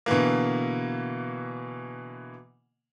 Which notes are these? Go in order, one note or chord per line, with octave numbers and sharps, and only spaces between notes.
B2 D3 E3 A#3